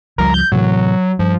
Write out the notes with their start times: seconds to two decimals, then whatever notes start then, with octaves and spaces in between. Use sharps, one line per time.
0.18 C#2 F3 G3 A#4
0.34 G6
0.52 A2 C3 E3 F#3
1.19 G2 F3